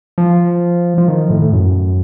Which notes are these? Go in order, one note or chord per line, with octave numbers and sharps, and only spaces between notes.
F3
F3
D#3
A2
A2
F#2